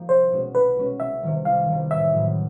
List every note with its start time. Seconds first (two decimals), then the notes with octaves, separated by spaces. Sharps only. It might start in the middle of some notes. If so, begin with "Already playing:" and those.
Already playing: F3 A#3 D#4 G4
0.09 C2 C5
0.31 B2 G#3 C#4 F#4
0.55 C2 B4
0.77 B2 G#3 C#4 F#4
1.00 C2 E5
1.23 C3 D#3 G3
1.45 C2 F5
1.68 C3 D#3 G3
1.91 A1 E5
2.13 A2 F#3